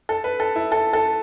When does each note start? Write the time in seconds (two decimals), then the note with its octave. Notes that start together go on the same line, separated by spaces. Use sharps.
0.09 A4
0.24 B4
0.40 A4
0.56 E4
0.72 A4
0.93 A4